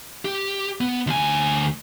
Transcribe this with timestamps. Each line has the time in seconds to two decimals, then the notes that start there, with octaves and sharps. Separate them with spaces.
0.25 G4
0.81 B3
1.07 D2 G#5